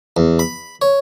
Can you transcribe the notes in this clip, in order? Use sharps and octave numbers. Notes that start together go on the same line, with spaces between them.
E2
B5
C#5